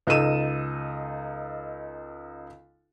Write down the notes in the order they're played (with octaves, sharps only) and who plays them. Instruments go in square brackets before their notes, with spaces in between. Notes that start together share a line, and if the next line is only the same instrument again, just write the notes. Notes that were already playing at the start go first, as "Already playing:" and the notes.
[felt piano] C#2 D#4 A4 D#7 E7